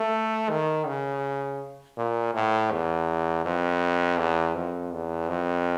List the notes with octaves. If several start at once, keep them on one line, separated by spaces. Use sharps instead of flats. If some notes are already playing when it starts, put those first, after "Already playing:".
Already playing: A3
D#3
C#3
A#2
A2
E2
F2
E2
F2
E2
F2